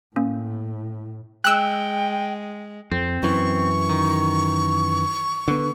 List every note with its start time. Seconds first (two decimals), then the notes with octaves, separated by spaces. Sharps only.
0.16 A2 A#3 C#4
1.44 G#3 G5 E6 F#6
2.92 F2 C4
3.23 F#2 E3 C#6
3.89 D#3
5.48 D3 B3